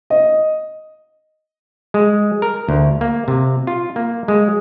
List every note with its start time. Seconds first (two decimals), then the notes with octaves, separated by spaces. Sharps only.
0.10 D#5
1.94 G#3
2.42 A#4
2.69 D2
3.01 A#3
3.28 C3
3.67 F4
3.96 A#3
4.28 G#3